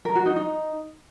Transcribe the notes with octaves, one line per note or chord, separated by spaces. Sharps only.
A#4
F#4
D#4
D#4